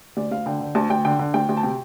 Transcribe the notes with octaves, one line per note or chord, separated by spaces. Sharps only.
D2 D5
D2 F5
D3 G5
D3
D2 A5
D2 G5
D3 G5
D3
D2 G5
D2
A5
C3 G5